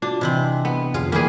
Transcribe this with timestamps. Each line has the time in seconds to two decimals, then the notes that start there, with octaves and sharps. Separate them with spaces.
0.02 D4 F4 F#4
0.21 C3 E3 C4 D#5 A5
0.65 B3
0.94 F2 D3 F4 G#4 F5
1.12 E3 G3 A#3 G#4